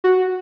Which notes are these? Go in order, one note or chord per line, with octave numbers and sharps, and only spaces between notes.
F#4